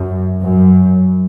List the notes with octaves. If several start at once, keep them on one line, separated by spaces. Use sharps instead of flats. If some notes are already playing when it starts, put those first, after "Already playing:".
Already playing: F#2
F#2